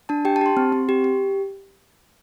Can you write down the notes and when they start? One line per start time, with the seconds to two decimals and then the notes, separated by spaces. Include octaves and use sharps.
0.09 D4 A5
0.25 G4 G5
0.36 A5
0.41 G4 C6
0.57 C4
0.72 C4
0.89 G4
1.04 G4